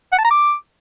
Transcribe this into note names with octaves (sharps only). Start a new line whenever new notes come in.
F#5
A5
A#5
D6